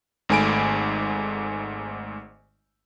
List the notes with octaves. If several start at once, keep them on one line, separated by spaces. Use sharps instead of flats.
G#1 G#2 A3 G#5 B5 D7